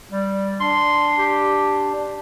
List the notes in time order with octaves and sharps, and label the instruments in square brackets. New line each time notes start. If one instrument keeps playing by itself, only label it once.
[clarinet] G3
[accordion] D4 [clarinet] C6
[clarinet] G4